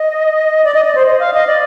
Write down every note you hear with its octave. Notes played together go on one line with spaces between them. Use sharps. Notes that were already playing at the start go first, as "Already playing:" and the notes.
Already playing: D#5
D5
D#5
D5
C5
D#5
F5
D#5
D5